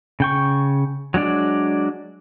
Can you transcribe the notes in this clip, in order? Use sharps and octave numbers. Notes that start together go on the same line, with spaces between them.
C#3 G5 C#6
F#3 G#3 D4 D5